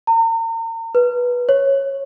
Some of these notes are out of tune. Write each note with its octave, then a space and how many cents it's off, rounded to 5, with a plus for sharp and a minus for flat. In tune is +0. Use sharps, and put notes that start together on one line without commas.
A#5 -40
B4 -15
C#5 -15